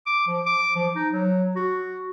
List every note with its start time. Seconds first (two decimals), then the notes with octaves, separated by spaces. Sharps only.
0.06 D6
0.28 F3
0.46 D6
0.75 F3
0.95 D#4
1.13 F#3
1.56 F#4